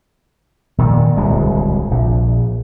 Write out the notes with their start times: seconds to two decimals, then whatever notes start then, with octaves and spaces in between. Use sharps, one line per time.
0.78 A#2 D#3
1.17 D1 C2 G#3
1.91 A#1